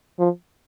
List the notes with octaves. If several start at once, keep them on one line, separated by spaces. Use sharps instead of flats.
F3